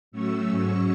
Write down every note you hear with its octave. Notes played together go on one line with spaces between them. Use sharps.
A2 F#3 A3 C#4 C#6 E6
G#2 F#3 C#4 C#6 E6